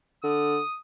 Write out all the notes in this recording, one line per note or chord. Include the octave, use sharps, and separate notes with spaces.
D3 D#6